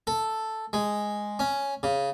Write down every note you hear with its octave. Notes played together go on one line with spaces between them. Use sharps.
A4
G#3
C#4
C#3